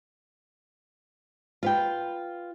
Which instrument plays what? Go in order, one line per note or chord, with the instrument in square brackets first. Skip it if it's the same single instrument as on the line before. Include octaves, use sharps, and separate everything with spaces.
[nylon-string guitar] F4 B4 G5